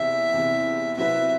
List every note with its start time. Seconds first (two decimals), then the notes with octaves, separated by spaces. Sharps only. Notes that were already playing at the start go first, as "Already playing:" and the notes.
Already playing: E2 C3 E3 E5
0.33 E2 C3 E3
0.97 C3 F#3 C4 E4 B4 E5